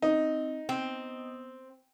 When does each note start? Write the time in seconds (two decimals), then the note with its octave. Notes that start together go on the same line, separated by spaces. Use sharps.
0.02 C4 D#4
0.69 B3 C4